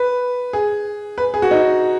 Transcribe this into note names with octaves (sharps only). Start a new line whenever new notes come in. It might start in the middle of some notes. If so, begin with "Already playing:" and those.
Already playing: B4
G#4
B4
G#4
F#4
D#4